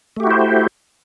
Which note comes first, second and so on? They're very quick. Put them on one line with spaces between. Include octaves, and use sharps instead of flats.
A3 G4 F#4 E4 C5